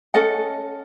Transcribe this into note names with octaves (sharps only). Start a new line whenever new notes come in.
C#4 A4 D#5 F#5